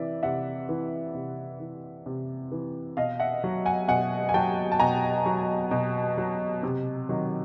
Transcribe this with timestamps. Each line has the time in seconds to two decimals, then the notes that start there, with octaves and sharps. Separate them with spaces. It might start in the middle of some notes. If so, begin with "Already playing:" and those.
Already playing: C3 E3 D5 E5
0.23 C3 E5 F#5
0.69 E3
1.15 C3
1.60 E3
2.06 C3
2.52 E3
2.97 B2 D#5 F5
3.20 E5 F#5
3.44 F#3
3.65 F#5 G#5
3.88 B2 F#5 G#5
4.29 G#5
4.34 F#3 G5 A5
4.72 A5
4.79 B2 G#5 A#5
5.26 F#3
5.71 B2
6.17 F#3
6.63 C3
7.09 D#3 F#3